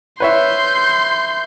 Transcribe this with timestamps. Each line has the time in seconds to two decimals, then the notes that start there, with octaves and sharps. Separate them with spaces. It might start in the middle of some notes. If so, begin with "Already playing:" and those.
0.20 B4 C#5 E5 C6 G6